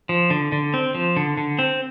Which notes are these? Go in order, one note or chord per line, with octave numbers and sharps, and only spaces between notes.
F3
D3
D3
C4
F3
D3
D3
C4